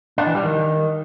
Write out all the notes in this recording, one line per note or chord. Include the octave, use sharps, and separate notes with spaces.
D4
E3
G3
D#3